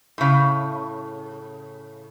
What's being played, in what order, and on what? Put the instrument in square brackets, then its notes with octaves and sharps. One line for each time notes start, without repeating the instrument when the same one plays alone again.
[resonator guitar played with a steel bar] A2 C#3